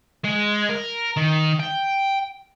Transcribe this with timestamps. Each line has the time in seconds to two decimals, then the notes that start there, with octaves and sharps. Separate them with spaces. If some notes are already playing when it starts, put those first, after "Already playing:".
0.25 G#3
0.70 A#4
1.17 D#3
1.60 G5